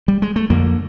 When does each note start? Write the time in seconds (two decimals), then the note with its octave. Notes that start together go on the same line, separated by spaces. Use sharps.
0.08 G3
0.22 G#3
0.36 A3
0.50 F2 D3 A#3